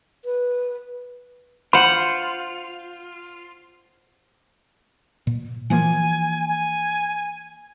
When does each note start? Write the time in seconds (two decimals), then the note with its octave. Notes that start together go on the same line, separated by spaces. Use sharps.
0.25 B4
1.73 F4 C5 F#5 B5
5.27 A#2
5.70 E3 F3 A#3 G#5
6.48 G#5